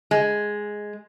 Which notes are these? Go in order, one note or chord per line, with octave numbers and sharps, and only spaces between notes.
G#3